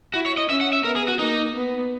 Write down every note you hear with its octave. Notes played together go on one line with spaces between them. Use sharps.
E4 F#4
C#5
D#5
C#4 E5
F#5
E5
B3 A#4
G#4
F#4
A#3 D#4
B3